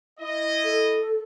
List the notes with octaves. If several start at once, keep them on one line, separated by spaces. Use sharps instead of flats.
E4 D#5
A4